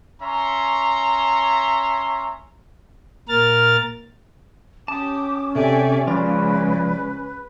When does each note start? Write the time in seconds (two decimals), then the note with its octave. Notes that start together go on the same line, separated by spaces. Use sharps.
0.22 C#4 E5 A#5 C6 C#6
3.28 A#2 A#4 F6 A6
4.88 C#4 G4 A5 D6 D#6
5.55 C3 G4 A4 D5 E5 G#5
6.07 C#2 C#3 F3 F4 B4 D5